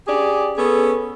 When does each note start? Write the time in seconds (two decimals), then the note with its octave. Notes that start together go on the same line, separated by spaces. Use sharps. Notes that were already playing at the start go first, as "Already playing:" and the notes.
0.08 C#4 G4 G#4 D5
0.57 B3 C#4 G#4 A4